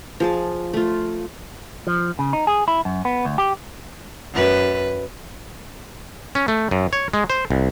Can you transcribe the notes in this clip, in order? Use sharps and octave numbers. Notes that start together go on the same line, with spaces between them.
F3 G#4 A5
A3 F4
F3
C#3
D#4
G#4
E4
F#2
B3
D2
G4
F#2 B4
C#4
A3
F#2
C#5
G#3
C5
C2